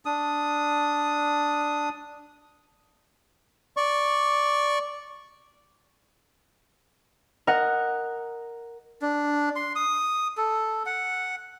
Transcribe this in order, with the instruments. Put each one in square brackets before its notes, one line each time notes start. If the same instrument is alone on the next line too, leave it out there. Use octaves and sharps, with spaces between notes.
[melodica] D4 D#6
[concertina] D5 C#6
[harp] A#4 D#5 F#5
[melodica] D4
C6
D#6
A4
F#5